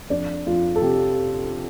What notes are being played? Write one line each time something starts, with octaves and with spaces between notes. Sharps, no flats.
F2 D4
F2 F4
A4
C3 G4